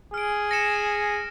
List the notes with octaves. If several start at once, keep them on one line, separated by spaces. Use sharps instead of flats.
G#4 F6 D7
A#6 C#7 E7